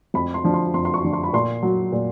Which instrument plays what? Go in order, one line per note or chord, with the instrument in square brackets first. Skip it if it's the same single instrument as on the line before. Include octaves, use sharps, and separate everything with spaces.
[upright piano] F2 B5
C6
D3 F3
C6
F2 C6
C6
C#6
D3 F3
C6
B5
A#2 C6
F#3
A#2